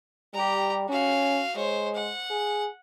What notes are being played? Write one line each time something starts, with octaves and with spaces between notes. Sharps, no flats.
G3 G4 A#5
C#4 F#4 F5
G#3 C5 C#5
F#5
G#4